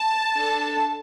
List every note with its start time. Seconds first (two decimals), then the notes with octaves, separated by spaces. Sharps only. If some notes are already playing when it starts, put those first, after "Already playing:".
Already playing: A5
0.38 D4 A4